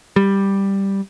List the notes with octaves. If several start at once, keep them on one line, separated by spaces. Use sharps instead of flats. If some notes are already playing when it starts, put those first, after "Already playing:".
G3